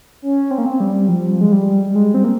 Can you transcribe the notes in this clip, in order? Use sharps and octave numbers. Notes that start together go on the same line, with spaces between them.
C#4
C4
A#3
C4
G3
F3
G#3
G3
G3
G#3
C4
A#3